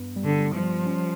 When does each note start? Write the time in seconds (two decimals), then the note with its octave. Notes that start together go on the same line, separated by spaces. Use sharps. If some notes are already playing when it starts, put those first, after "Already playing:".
Already playing: G2 B3
0.16 G3
0.24 D3
0.40 G3
0.55 F3
0.63 G3
0.86 C#4